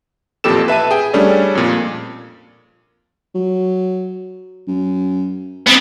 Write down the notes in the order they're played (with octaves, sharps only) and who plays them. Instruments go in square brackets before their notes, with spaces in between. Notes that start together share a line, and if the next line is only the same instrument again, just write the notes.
[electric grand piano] A1 F2 A#2 G4 A4 E7
B4 E5 A5 D#7
G#4 G5
G3 A3 C#4 D4 G#4 A4
F2 A#2
[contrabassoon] F#3
F#2
[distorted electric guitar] B3 C4